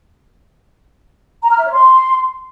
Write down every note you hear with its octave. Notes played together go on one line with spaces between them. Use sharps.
A#5
F6
E5
C#5
C6